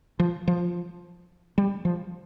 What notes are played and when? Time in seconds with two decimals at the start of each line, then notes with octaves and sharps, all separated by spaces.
0.20 F3
0.48 F3
1.58 G3
1.85 F3